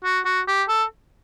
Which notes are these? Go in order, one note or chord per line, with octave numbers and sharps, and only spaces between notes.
F#4
F#4
G4
A4